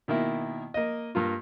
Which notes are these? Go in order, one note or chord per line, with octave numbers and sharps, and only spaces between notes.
B2 D#3 A#3 E4
A#3 D#5
G2 A#3 F4